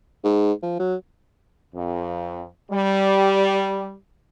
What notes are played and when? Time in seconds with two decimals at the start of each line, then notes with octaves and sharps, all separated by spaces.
0.24 G#2
0.63 F3
0.80 F#3
1.75 F2
2.72 G3